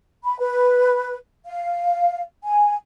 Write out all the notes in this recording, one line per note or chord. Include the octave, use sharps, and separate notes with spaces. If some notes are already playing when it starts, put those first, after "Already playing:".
B5
B4
F5
G#5